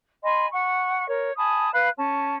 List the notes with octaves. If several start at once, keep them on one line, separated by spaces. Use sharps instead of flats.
D#5 G#5 B5 C6
F#5 C#6
A#4 C#5
G#5 A5 B5 D#6
B4 F5 B5 F#6
C#4 A5